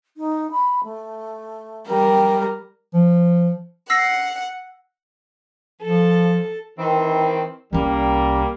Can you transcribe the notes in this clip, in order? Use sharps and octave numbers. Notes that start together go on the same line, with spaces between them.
D#4
B5
A3
G3 A#4 G5
F3
F#5 E6 A#6 C7
F3 A4
D#3 E3 C4
C2 G3 A#3 C#4